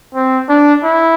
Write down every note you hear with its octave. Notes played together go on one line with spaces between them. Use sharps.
C4
D4
E4